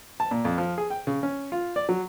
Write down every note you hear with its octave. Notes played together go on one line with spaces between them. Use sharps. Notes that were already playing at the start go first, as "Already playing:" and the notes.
A5
A#2
F2
F3
G#4
G5
C#3
C#4
F4
D5
F#3